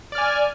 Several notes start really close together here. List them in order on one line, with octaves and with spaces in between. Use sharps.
D5 F6 G#5